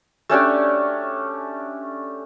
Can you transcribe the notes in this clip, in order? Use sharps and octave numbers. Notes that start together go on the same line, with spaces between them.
A3 C#4 D4 G4